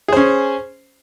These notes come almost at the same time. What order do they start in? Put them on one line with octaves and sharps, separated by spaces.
G#4 C5 C#4